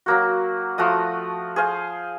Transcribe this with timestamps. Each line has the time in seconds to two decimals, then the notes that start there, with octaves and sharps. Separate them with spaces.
0.06 F#3 A#3 F#4
0.78 F3 A3 F#4 D#6
1.56 G#4 C5 F5